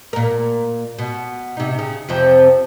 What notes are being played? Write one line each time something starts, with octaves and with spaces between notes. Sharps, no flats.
A#2 A#4
B2
C3 D#4
C#3
F2 C3 F3